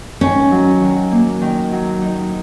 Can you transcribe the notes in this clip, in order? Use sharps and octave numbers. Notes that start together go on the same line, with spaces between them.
D#3 C#4
F#3
D#3
A#3
D#3
F#3
D#4